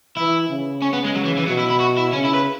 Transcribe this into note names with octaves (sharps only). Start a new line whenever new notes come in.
E3 E4
C#3
C#4
B3
G#3
F#3
E3
E3
B2 F#3
E4
E4
F#4
E4
C#3 C#4
E4
B4